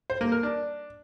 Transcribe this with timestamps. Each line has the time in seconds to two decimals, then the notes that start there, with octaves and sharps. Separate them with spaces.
0.10 C5
0.21 A#3
0.32 A#4
0.43 D4